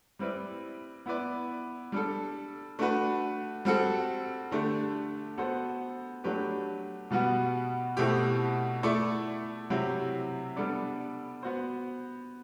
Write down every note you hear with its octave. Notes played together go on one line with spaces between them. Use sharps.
G3 C4 E4 B4 D5
B3 E4 B4 D5
G3 D4 A4
A3 D4 F#4 B4
G3 C4 F#4 A4
D3 A3 D4 G4
B3 F#4 A4 C5
F#3 A3 D4 G4 B4
B2 G3 B3 F#4
B2 A3 C4 E4 G4
A3 E4 A4 D5
C3 F#3 C4 E4 G4
G3 B3 D4 A4 D5
B3 F#4 C5